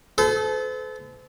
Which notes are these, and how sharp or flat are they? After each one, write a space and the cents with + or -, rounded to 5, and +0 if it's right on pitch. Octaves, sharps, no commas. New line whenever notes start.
A4 -30 C5 -45